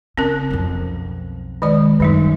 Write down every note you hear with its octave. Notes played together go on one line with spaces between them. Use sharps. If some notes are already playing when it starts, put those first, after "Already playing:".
C#3 C4 C#4 A#4
B1 F2
D#3 G#3 D5
F#2 D#3 G3 D#4